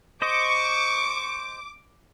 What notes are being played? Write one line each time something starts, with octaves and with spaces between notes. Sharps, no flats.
C5 D#5 C#6 D6